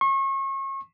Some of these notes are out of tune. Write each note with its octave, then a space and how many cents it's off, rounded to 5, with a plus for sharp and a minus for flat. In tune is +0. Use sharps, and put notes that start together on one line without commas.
C#6 -35